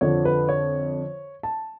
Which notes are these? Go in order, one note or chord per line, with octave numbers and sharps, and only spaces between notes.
F2 D3 F3 C#5
B4
C#5
A5